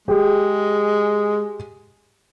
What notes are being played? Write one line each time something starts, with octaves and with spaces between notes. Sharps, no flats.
G#3 G4 G#4